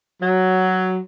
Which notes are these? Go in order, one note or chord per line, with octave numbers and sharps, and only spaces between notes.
F#3